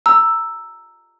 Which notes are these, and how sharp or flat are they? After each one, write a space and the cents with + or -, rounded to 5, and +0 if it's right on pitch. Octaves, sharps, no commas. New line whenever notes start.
A#5 -10 E6 +0